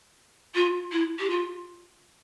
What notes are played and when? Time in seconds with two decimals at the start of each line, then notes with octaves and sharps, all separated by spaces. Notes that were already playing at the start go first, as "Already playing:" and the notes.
0.54 F4
0.91 E4
1.18 G4
1.29 F4